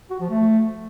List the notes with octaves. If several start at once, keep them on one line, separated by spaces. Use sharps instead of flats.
F#4
F3
A3